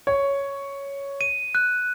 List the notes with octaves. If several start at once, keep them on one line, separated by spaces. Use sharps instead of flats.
C#5
D#7
F#6